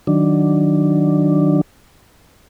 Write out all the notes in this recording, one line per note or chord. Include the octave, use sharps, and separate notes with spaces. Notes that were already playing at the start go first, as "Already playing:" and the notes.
D#3 F#3 D4